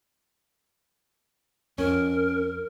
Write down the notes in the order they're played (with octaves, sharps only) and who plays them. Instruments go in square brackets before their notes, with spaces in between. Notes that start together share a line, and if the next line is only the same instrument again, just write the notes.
[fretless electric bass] F2 [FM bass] C#4 [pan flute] A#4